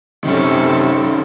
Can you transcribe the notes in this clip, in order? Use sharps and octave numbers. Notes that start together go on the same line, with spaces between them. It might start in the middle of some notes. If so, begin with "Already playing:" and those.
F#2 C3 D#3 C#4 A4